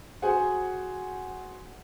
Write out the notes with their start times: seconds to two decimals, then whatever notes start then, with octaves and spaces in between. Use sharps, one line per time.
0.22 F#4 G#4 C5 F#5 G#5